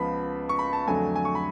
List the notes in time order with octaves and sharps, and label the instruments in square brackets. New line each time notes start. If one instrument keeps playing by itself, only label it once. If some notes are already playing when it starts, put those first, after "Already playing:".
Already playing: [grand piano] C#2 C#3 F3 B3 A5 B5
C#6
B5
A5
F2 D3 F#3 A3 G#5
G#5
C#6
B5